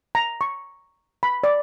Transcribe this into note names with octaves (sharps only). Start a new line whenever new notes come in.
A#5
C#6
B5
D5